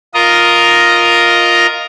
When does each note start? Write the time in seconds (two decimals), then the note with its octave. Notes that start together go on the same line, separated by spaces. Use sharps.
0.14 F4 A#4 D#5 A#5